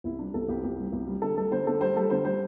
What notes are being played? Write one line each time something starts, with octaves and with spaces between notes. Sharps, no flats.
C2 E4
G3 D4
C2 A4
C2 G4
C2 G4
G3
C2
G3
D3 A4
G3 A4
D3 C5
D3 A4
G3 C5
G3 A4
D3 C5
G3 C5